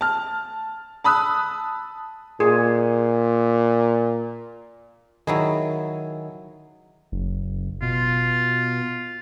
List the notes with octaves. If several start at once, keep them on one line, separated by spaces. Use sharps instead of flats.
A5 F6
A5 B5 D#6 E6 F#6
A#2 G#4
D#3 F#3 E4 G#4
F#1
B2 F4